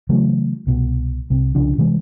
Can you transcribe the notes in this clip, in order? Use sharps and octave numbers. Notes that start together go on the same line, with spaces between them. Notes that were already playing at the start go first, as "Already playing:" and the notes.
C#3 E3 F#3 A3
C2 B2
C2 C3
C2 C#3 F3 D4
C3 E3 G3 G#3